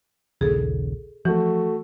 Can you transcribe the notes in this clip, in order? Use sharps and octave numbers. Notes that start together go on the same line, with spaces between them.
A#1 D#2 C#3 G#4 A4
E3 F3 A3 F#4